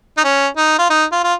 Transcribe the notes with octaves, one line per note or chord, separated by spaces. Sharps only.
D#4
C#4
D#4
F4
D#4
F4
F4